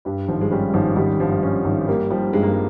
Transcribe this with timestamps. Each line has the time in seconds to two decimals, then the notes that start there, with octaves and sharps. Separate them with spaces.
0.05 G2 G3
0.28 G#1 F3
0.41 G#3
0.51 G3 C#4
0.74 G#1 F3
0.96 G#1 G3
1.20 G2 F3
1.43 C#4
1.65 G#1
1.88 G3 A#3
2.10 F3 G3
2.33 G2 G#3
2.43 A#3
2.51 G#3